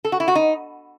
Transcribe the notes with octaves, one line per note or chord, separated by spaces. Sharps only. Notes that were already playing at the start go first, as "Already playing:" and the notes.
A4
F#4
E4
F#4
D#4